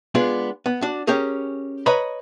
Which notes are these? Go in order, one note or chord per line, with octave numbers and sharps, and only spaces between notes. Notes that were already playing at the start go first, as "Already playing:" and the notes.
G#3 B3 D4 F4
B3
D4 F#4
C#4 G4 G#4 A#4
B4 C#5 D#5 A#5 B5